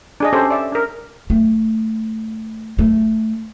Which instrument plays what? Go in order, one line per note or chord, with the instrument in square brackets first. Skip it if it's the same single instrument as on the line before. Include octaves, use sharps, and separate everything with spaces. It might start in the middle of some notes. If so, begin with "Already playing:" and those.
[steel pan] D4 G#4 D#5
C#4 G4 A4 C5
D5 E5
D4 A#4
[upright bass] A3
A3